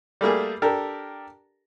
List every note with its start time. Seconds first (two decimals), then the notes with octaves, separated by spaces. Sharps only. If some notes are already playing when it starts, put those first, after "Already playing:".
0.21 G3 A3 A#3 G#4
0.62 D4 G4 A4 A#4